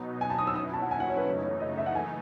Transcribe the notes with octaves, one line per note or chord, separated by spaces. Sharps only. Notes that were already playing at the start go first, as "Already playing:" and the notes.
Already playing: B2 F#3 B3 D#4
G#5
A5
D#6
E6
B2 F#3 C#4 E4 D#6
A5
F#5
G#5
F#5
C#5
B4
F#2 C#3 E3 A3 D#4 C#5
C#5
D#5
E5
F#5
G#5